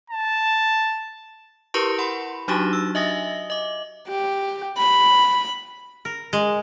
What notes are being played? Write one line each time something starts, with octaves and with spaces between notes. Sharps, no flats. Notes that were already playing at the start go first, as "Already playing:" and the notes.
A5
E4 G4 A#4 B4 C6 C#6
F#5 B5 C6
F#3 D4 D#4 F#4 G4 C#6
E6
D#5 E5 G#5 D#6 A6 A#6
D#5 D6
G4
B5
A#4
G#3